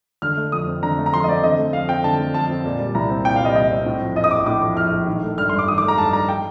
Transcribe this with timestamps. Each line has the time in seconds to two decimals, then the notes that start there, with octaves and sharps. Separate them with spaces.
0.22 D3 F6
0.37 A3
0.52 F2 D#6
0.67 C4
0.83 D3 A#5
0.98 A3
1.06 A#5
1.13 F2 C6
1.24 D#5
1.28 C4 D5
1.43 D3 D#5
1.58 A3
1.73 F2 F5
1.88 C4 G5
2.04 D3 A5
2.19 A3
2.34 F2 A5
2.49 C4
2.65 A#2
2.80 G3
2.95 C2 A#5
3.10 C4
3.25 A#2 G5
3.36 F5
3.41 G3 D#5
3.56 C2 D#5
3.71 C4
3.86 A2
4.02 F3
4.16 A#1 D#5
4.24 D#6
4.31 A#1 D6
4.46 A2 D6
4.62 F3 D6
4.77 A#1 F6
4.92 A#1
5.07 D#3
5.23 A3
5.38 G2 F6
5.49 G2 C6
5.59 D6
5.68 D#3 D#6
5.78 D6
5.83 A3
5.88 A#5
5.98 G2 A5
6.13 G2 A#5
6.29 G5